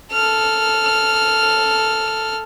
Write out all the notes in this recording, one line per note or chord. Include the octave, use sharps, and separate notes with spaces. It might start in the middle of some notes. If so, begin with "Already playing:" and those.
A4 F6